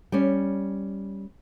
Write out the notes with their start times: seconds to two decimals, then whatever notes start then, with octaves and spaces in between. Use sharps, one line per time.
0.12 G3 C#4